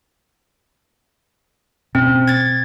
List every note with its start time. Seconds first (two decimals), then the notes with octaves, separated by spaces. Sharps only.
1.95 B2 C4 C#4
2.28 G#6 A6